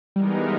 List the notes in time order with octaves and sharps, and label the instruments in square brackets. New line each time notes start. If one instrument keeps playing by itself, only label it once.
[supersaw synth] E3 G#3 B3 D#4 A#4 [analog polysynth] G3